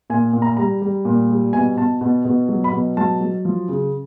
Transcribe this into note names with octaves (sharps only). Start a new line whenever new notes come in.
A#2 G#5
A#2
A#5
G3 A#5
G3
A#2
G3
B2 G#5
B2 A5
B2
B2
F#3
B5
B2
F#3 A5
F#3
F3
C#3